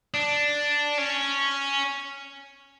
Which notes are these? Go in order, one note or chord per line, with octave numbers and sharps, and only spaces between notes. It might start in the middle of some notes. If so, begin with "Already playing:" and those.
D4
C#4